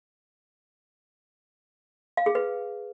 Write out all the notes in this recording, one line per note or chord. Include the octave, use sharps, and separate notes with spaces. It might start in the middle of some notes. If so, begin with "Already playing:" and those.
F5
G#4
B4